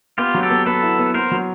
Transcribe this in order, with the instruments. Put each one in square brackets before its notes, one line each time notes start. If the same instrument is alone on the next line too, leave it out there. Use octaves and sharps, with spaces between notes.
[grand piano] B3 [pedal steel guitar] F4 G4
[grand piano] F#3
[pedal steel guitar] G4 A4
[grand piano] B3
[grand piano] B3 [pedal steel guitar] A4 B4
[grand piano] E4
B3
[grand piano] B3 [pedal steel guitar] A#4 C5
[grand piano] F#3